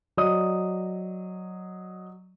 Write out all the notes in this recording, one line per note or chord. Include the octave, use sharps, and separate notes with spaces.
F#3 D5 D#5 D#6